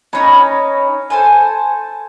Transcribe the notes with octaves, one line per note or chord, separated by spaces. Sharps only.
C#4 D#4 C#5 B5
A4 C5 G#5